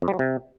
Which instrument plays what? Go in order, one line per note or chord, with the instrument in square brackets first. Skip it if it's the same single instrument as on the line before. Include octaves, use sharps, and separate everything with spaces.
[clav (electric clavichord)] F2
G3
F#3
C3